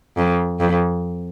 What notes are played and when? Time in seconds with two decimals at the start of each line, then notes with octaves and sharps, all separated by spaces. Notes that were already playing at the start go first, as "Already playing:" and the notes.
0.17 F2
0.60 F2